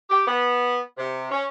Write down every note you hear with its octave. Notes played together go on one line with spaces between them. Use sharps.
G4
B3
C3
C#4